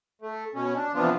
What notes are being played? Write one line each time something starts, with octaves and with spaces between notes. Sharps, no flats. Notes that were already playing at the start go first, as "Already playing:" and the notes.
A3
B2 C#4
D4
C3 E3 F3 B3 D4 F4